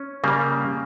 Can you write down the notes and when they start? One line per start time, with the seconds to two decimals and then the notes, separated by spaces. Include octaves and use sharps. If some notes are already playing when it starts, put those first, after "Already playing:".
Already playing: C#4
0.24 C#3 G3 A#3